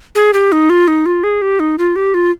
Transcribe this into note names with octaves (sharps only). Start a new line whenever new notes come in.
G#4
G4
D#4
F4
D#4
F4
G#4
G4
D#4
F4
G4
F4